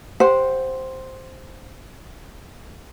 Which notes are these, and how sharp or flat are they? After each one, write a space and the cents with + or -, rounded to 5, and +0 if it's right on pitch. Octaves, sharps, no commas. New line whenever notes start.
G4 +0 C5 +0 F#5 -25